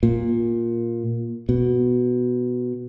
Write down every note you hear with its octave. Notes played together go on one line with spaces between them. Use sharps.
A#2
B2